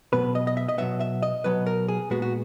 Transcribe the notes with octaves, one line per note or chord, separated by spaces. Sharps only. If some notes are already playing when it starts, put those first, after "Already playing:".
B2 F#3 B3 B4
D#5
D#5
E5
D#5
B2 F#3 B3 E5
E5
D#5
B2 F#3 B3 B4
A#4
G#4
A#2 G#3 B3 F#4
F#4